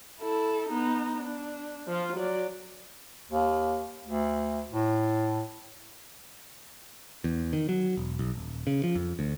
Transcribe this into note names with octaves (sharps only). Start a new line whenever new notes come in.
E4 A4
B3 D#4
D4
F3 F4
F#3 D5
D#2
D2
A2
E2
D#3
F#3
E1
B1
D#1
C#3
F3
F2
D2